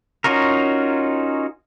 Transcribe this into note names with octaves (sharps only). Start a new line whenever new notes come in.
C#4 D#4 F4 F#4 A#4